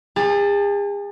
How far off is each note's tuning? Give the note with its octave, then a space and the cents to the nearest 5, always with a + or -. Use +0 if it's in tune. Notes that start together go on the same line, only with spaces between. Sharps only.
G#4 -40 A5 +10